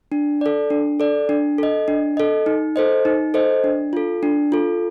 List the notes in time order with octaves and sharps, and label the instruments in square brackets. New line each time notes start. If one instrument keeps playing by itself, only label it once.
[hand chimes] D4
A4 D5
D4
A4 D5
D4
A4 D#5
D4
A4 D#5
D#4
A4 C5 D#5
D#4
A4 C5 D#5
D4
F4 A4
D4
F4 A4